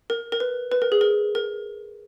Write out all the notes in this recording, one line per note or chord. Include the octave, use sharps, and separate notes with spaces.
A#4
A#4
B4
B4
A#4
G#4
A#4
A#4